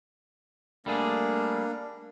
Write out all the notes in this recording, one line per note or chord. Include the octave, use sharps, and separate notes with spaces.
G3 A3 A#3 D4 G#4